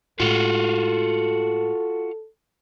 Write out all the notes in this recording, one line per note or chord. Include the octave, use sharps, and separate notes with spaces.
A2 G#3 F4 F#4 A4